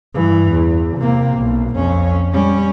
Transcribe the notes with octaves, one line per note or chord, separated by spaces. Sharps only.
G2 E3
E2
C3 A#3
B1
F2 C#4
G3 C#4